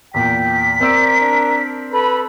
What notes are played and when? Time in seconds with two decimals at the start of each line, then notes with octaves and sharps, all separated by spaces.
0.14 E2 A#2 G5 B6
0.81 C4 A#4 D5 E6 D7
1.20 D4
1.92 A4 B4 B5